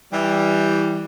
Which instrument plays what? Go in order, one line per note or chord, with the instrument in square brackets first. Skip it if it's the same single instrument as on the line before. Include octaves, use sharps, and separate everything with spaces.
[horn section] E3 G3